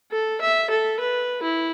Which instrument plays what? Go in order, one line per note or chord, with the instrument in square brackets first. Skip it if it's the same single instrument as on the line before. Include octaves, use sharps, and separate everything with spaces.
[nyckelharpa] A4
E5
A4
B4
E4